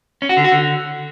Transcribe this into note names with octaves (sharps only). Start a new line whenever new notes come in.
C#4
F#4
D3
F#4
D3